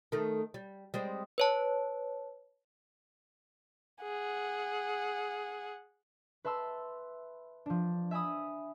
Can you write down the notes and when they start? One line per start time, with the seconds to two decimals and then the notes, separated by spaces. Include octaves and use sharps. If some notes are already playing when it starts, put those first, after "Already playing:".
0.12 D#3 A3
0.54 G3
0.94 G3 G#3 C4
1.38 B4 C#5 A5
4.02 G#4 F#5
6.45 B4 E5 A5 C6 E6
7.66 F3 D4
8.11 E5 G#5 B5 D#6